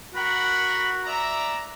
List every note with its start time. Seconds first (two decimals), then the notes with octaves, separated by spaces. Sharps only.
0.14 F#4 A#4 F#5 B5
1.05 D5 E5 A#5